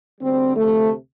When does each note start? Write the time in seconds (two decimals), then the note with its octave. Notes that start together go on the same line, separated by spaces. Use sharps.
0.21 D2 D3 G3 C4
0.57 D2 C3 F3 A3